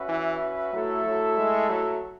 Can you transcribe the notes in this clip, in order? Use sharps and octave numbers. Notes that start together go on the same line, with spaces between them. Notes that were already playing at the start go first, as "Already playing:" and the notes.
Already playing: C#4 F#4 B4 E5
E3
F#3 A3 E4 A4 E5
F#3
G#3
F#3